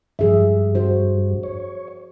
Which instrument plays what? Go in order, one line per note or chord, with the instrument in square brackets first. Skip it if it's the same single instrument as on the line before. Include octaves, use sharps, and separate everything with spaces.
[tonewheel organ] G2 [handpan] F3 G#4 E5
[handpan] F#4 C5
[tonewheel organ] C#5